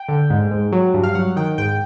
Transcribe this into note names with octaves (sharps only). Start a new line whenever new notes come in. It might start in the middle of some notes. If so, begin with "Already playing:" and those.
Already playing: G5
D3
G#2
G#2
F#3
G2
F5
F#3 F#5
D#3 G5
G#2 G5